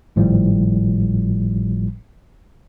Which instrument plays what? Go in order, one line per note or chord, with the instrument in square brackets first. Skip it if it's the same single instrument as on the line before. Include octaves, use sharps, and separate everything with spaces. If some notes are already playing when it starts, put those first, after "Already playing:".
[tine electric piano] G#1 A2 F3 G3